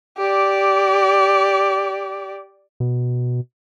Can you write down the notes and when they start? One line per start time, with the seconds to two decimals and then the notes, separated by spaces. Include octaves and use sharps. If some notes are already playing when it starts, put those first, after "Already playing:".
0.18 G4 D5
2.80 B2